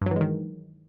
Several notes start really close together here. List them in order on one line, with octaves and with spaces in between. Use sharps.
G2 F#3 E3 G#3 D#3